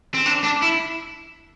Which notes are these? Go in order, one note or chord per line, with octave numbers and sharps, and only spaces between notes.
C4
D4
D4
E4